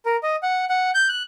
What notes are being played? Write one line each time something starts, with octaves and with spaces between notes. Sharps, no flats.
A#4
D#5
F#5
F#5
G6
F#6